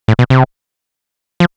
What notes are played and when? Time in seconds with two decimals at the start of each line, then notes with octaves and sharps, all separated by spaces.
0.08 A2
0.19 B2
0.30 C3
1.40 F3